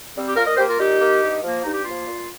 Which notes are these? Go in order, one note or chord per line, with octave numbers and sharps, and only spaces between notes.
G3 C4
G4
A#2 F4 A#4
A#4 D#5
A#3 G4 C5
F4 A#4
A#2 D#4 G4
A#3
G2
F3 A#3
G2 D#4
G4
F3 A#3 F4
A#2